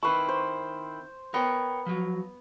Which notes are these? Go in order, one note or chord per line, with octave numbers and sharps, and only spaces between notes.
D#3 C4 E4 B4 C#6
C5
B3 A#4 C#5 G5
F3 F#3